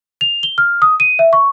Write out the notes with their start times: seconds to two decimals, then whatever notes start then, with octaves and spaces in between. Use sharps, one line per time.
0.21 F7
0.43 G7
0.58 F6
0.82 D#6
1.00 D#7
1.19 E5
1.33 C#6